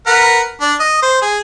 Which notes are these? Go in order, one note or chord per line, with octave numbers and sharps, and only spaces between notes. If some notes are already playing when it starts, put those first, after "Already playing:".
A#4 B4 F#5
D4
D#5
C5
G#4